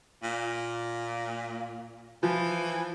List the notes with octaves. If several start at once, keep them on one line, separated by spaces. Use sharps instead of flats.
A#2
E3 F3